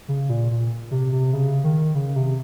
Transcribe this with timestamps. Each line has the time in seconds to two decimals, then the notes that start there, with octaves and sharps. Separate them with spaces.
0.08 C#3
0.29 A#2
0.51 A#2
0.91 C3
1.12 C3
1.33 C#3
1.64 D#3
1.95 C#3
2.16 C3